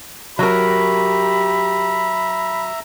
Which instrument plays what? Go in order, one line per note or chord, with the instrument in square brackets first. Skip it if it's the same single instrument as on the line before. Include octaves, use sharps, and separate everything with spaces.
[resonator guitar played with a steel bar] F#3 A#4 [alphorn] G4 [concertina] E5 A#5 [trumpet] B5